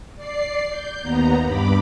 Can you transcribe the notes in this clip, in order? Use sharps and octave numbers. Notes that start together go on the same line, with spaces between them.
D5 C7
G6
D#2 B3 A#5
G2 B5 D6